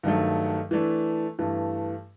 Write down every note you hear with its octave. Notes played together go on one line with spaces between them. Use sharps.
G2 D#3 F#3 A3
E3 A3 D4
G2 E3 A3